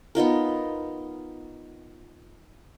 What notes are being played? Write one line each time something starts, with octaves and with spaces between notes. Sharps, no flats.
B3 D#4 F4 A#4